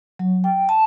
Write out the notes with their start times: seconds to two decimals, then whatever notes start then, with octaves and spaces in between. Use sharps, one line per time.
0.19 F#3
0.44 G5
0.69 A5